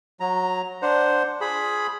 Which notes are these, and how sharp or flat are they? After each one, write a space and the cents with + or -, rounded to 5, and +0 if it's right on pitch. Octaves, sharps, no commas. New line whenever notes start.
F#3 -15 A#5 +0
D4 +0 C5 +0 F#5 +0
F4 +0 G#4 +10 B5 +0